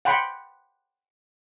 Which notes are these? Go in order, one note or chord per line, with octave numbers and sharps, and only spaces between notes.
F#5 G5 B5 C6